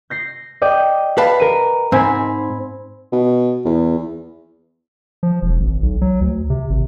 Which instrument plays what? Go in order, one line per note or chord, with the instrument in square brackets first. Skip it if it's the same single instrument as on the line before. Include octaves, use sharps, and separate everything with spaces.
[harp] G6 A#6 C7
D5 D#5 G5
[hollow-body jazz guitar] B4 F5 A5
[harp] A#4 D#7
[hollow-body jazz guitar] G#2 [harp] C4 G#5 B5
[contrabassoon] B2
E2
[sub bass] F3
E1
G#1
B1
F#3
D2
C3
G#1